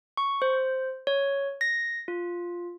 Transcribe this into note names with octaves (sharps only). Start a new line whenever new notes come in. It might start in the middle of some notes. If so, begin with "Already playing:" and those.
C#6
C5
C#5
A#6
F4